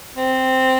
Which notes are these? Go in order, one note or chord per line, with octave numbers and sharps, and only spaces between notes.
C4